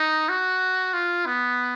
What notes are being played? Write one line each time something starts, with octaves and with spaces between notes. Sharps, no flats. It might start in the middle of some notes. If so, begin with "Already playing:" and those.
Already playing: D#4
F#4
F4
B3